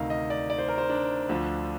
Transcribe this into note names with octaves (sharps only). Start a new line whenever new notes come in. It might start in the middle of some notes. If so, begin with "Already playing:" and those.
Already playing: D2 C3 D#3 D#5 F5
D#5
D5
D5
C5
A#4
C5
D4
D2 D3 F3 D4